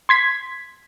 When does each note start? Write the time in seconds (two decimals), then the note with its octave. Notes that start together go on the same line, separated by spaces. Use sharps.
0.09 C6 G#6 B6